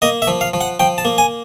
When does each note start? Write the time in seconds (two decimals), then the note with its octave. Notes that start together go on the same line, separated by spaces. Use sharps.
0.02 A#3 D#5
0.22 E5
0.28 F3
0.41 F5
0.54 F3
0.61 F#5
0.80 F3 G5
0.98 A5
1.05 A#3
1.18 G#5